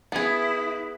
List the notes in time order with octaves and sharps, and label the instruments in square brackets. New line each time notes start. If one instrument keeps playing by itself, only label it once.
[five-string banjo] B3 G#4 [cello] E4